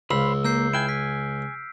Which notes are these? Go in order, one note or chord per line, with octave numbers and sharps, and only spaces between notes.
C#2 C5 F5 B5 E6
A#3 E6 G6 C7
E4 G5 G#5 F6 D7
G#5 B6